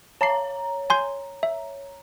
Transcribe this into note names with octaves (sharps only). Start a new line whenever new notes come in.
C#5 A5 A#5 C7
G#5 C6 G6
E5